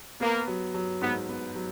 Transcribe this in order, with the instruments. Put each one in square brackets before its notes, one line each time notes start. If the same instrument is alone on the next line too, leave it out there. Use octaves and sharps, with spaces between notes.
[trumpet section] A#3 [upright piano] B3
[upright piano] F#3
F#3
[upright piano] G#2 [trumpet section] B3
[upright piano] B3
F#3